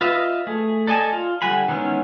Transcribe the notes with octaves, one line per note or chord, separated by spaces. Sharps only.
F4 B4 D#5 E5
A3 G#4
A4 D5 D#5 G#5 A5
F4
D3 G3 F#5 G#5 B5
D#3 E3 G#3 B3 C#4